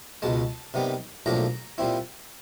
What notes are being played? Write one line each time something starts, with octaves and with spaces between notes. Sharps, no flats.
C#2 B2 G#3 A5
C3 D#3 G3 B3
B1 A2 F3 A#3 D4 A#5
A#2 G3 C4 E4